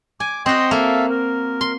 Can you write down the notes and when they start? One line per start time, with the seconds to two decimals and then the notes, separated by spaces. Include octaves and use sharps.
0.20 G#5 D6
0.46 C4 F#4 D#5 G5 C6
0.71 A#3 A4 E5 F5
1.10 A#4
1.61 C6